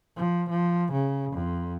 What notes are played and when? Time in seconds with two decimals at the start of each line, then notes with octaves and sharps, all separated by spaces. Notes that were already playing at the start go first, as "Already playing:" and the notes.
0.17 F3
0.50 F3
0.93 C#3
1.33 F2